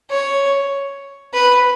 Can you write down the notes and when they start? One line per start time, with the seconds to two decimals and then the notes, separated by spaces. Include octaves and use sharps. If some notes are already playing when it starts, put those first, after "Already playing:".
0.10 C#5
1.34 B4